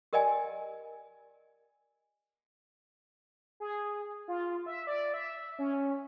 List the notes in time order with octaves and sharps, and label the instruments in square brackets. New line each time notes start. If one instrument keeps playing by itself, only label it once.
[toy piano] G4 A#4 D5 D#5 G5 G#5
[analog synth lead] G#4
F4
E5
D5
E5
C#4